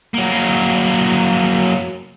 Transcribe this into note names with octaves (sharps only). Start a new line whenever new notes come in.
F#3 A#3